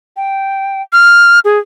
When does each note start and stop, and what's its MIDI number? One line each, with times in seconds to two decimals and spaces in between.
0.17 0.82 79
0.93 1.39 89
1.45 1.59 68